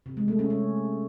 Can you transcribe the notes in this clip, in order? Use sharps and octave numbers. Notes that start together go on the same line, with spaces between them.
C3
G#3
A3
C#4
C#4